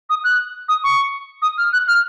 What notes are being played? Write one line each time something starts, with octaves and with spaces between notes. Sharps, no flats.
D#6
F#6
D#6
C#6
D#6
F6
F#6
F6